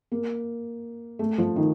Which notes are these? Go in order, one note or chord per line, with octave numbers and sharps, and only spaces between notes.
A#3
A3
F3
D#3